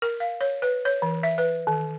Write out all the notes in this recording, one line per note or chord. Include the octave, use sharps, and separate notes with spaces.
A#4
F5
C#5
B4
C#5
E3
E5
B4
D#3